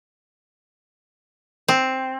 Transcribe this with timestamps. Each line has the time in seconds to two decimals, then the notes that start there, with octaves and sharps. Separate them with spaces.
1.68 C4